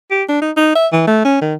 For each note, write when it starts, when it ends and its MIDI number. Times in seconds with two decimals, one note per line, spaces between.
0.11 0.24 67
0.29 0.40 62
0.42 0.51 63
0.57 0.72 63
0.75 0.87 76
0.93 1.05 52
1.07 1.20 57
1.25 1.39 61
1.41 1.54 51